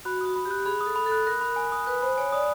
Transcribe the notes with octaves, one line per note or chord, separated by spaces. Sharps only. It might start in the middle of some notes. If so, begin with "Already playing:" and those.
F#4 B5
F#4 D#6
B5
G4
F#6
G#4 B5
D#6
A4
B5
A4
F#6
A#4 F#6
B5
G#5
D#6
B4 F#6
C5 B5
C#5 G#5
D5 D#6